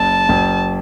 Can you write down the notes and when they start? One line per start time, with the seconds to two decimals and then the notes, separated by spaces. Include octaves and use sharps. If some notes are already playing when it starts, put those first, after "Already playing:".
Already playing: F#1 A5
0.29 F#1